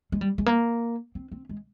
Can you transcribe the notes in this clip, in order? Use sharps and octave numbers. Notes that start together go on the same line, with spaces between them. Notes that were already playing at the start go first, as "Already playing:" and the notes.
G#3
G3
G#3
A#3
C4
C4
G#3